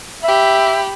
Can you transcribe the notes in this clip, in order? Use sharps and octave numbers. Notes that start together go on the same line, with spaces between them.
G4 E5 B5